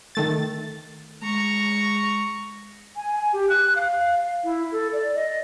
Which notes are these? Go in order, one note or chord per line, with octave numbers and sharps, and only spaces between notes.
D#3 A3 A6
G#3 A#5 C#6
G#5
G#5
G4
F#6
F5
F5
E4
A4
D5
D#5